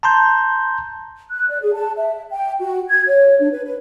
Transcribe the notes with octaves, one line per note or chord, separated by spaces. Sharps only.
A5 A#5 C6 G6
F#6
D5
G#4
A5
E5
G5
F#4
G#6
C#5
D4
B4
B4